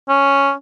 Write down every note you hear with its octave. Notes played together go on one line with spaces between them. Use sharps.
C#4